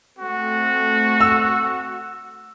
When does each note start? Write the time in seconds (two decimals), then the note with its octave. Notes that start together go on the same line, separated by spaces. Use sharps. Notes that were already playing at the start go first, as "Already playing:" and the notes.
0.19 A3 C4 F#4 A4
1.20 E6